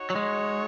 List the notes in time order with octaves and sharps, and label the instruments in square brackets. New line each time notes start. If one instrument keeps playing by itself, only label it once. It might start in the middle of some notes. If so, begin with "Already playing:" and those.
Already playing: [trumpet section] D#4 F#4 C#5
[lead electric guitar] F#3
G#3